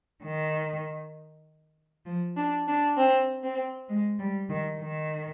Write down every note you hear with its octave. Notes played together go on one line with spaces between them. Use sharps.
D#3
F3
D4
D4
C4
C4
G#3
G3
D#3
D#3